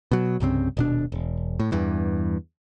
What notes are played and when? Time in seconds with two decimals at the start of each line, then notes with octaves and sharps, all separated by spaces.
0.11 B2 F#3
0.40 C2 G2 C#3 C4
0.77 D#1 B2 D4
1.12 E1
1.59 A2
1.72 E2 G2 E3